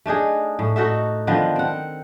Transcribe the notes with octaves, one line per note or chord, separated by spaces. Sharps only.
A3 D4 D#4 G#4
A2
D#4 F#4 A4 E5
D3 D#3 F3 B3
C4 F#5